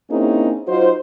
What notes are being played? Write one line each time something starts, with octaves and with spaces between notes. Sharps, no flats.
A#3 C4 C#4 D#4 E4 G#4
F#3 D#4 F4 F#4 C5